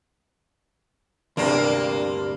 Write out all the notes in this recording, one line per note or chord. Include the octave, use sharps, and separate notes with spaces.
D2 G2 C3 A#3 D4